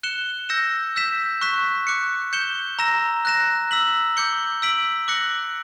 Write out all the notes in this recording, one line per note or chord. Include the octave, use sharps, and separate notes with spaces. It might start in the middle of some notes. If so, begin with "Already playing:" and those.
F#6 C#7 E7 G7
E6 G6 A#6 C#7 E7
E6 G6 B6 E7
C#6 F#6 B6 E7
D6 F#6 C#7
G6 C#7 E7 G7
A#5 E6 A#6 E7
F#6 A#6 E7
E6 B6 F#7
D6 G6 C#7 G7
E6 B6 D7 F#7
D6 F#6 A#6 C#7 F#7